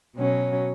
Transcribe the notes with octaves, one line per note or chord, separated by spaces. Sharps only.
B2 F#3 C#4